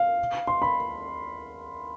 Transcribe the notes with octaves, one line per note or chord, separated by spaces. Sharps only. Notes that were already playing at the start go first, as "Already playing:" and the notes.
Already playing: F5
C6
B5